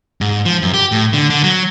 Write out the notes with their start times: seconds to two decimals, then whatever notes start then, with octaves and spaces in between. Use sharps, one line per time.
0.21 G#2
0.45 F3
0.62 F#2
0.74 G4
0.92 A2
1.13 D3
1.30 D3
1.44 F#3